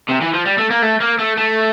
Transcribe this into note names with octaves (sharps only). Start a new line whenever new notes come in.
C3
E3
F3
G3
A3
A#3
A3
A#3
A3
A3